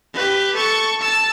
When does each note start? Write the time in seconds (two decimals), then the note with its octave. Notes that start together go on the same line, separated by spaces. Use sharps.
0.14 G4 B4
0.55 A4 C#6
1.01 A5 E6